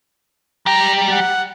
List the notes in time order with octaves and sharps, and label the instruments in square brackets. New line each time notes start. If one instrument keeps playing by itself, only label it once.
[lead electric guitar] G3 G5 [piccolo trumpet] A#5
[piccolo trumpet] F#5